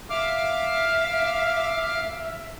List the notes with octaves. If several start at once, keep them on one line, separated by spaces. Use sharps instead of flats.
E5 F5 D6 F6